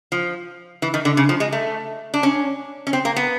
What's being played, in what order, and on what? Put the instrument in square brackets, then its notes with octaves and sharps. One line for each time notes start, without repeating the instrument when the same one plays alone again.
[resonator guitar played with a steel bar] F3
E3
D#3
D3
C#3
F3
G#3
A3
D4
C#4
C#4
C4
A#3
B3